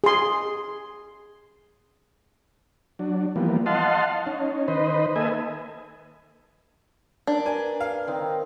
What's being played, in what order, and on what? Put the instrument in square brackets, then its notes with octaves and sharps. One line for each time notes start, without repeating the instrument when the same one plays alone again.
[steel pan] G#4 C6
[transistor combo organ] F#3 D4
E3 F3 G3 A#3 B3
D#5 F5 F#5 A5 C6
C#4 D#4
D#3 B4 C5 D#5
A#3 A4 B4 D#5 E5 G#5
[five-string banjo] D4 [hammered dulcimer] A#4
[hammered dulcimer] B4 [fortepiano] G#5
[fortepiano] F5
[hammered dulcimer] D#3 C4 D#4